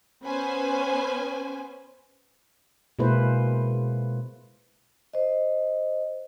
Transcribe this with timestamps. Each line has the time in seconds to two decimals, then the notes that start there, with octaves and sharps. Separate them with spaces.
0.25 B3 C#4 B4 C5 G#5
2.99 B2 G#3 A#3 E4 B4 C5
5.14 C5 D#5